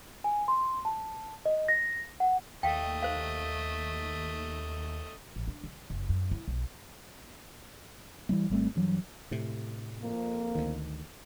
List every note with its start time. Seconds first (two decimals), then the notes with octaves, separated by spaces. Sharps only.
0.24 G#5
0.48 C6
0.85 A5
1.46 D#5
1.68 A#6
2.20 F#5
2.63 D#2 A3 D#5 F5 G5
3.03 C5 F5
5.36 A1
5.48 D4
5.64 D3
5.90 F#1
6.09 F#2
6.31 E4
6.48 B1
8.29 E3 G3 A3
8.50 G#1 G3 A3 C4
8.76 G2 E3 F#3
9.31 A2 C3
10.01 F2 A#3
10.55 D2 D#3